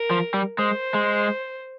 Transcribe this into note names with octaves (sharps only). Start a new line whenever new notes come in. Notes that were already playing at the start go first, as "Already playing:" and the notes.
Already playing: A#4
F3
G3
G#3 C5
G#3